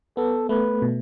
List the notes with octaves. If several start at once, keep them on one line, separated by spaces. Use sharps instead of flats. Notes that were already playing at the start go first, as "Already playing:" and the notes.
B3 A4
A3 B4
B2